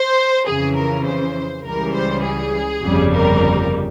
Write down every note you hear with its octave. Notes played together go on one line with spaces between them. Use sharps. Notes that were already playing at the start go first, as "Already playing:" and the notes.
Already playing: C5
F2 C#3 E3 G#4
A#4
C5
C#2 C#3 E3 G3 A#4
C5
G#4
G1 F2 C#3 G3
A#4